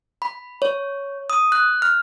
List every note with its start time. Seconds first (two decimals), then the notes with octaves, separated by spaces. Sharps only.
0.22 B5
0.62 C#5
1.30 D#6
1.52 F#6
1.82 F6